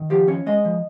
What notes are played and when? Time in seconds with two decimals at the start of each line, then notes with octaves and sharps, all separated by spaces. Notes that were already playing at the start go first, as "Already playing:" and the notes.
Already playing: D#3
0.10 F3 G4
0.28 C#4 C#5
0.46 G#3 D#5
0.65 F3